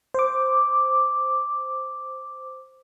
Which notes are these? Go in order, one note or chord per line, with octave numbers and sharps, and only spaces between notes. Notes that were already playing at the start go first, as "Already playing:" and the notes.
C5 D6